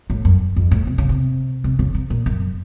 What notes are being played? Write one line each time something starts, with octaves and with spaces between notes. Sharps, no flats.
A2
F#2
F2
A2
C3
C#3
C3
C3
C#3
C3
A#2
F#2